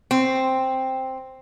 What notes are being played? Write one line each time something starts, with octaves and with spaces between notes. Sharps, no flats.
C4